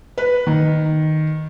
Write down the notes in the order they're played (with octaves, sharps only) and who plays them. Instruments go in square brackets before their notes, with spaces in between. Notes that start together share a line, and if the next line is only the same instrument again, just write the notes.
[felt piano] B4
D#3